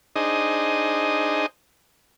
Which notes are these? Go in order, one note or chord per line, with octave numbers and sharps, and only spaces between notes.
D4 D#4 G#4 C5 D#5